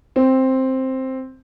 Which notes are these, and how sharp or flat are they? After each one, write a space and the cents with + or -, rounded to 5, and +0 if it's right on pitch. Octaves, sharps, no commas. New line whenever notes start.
C4 +5